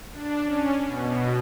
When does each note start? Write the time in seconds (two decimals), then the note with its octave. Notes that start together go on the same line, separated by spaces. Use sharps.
0.12 D4
0.45 C#4
0.86 B2